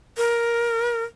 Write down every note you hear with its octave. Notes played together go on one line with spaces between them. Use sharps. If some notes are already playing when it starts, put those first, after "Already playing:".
A#4